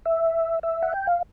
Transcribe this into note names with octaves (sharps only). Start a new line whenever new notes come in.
E5
E5
F#5
G5
F5